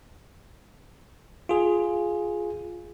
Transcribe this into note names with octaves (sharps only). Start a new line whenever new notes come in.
F4 G#4